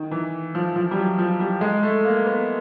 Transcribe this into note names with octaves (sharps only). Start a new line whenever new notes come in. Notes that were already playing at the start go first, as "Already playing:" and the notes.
Already playing: D#3
E3
F3
F3
G3
F#3
F3
G3
G#3
A3
A#3
B3